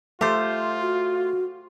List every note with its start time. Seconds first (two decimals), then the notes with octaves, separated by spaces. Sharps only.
0.21 A3 F4 G4 C5
0.81 F#4